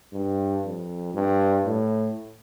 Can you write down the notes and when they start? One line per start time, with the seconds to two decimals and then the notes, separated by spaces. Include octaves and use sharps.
0.13 G2
0.64 F2
1.14 G2
1.66 A2